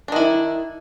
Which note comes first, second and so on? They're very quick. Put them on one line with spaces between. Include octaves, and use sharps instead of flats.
D4 D#3 E4